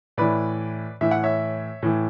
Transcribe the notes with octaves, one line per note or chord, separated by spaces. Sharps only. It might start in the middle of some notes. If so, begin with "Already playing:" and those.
A2 E3 B4 D5
A2 E3 E5
F#5
C#5 E5
A2 E3